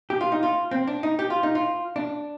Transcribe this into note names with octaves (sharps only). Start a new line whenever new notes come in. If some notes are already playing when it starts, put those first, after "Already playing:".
G4
F4
D#4
F4
C4
D4
D#4
G4
F4
D#4
F4
D4